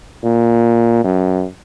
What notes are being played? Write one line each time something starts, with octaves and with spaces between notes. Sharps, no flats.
A#2
F#2